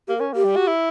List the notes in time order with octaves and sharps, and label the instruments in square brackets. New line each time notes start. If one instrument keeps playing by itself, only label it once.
[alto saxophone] A#3 [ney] G4
[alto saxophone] C#4 [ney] A#4
[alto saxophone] A#3 [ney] G4
[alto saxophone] G3
F#4
E4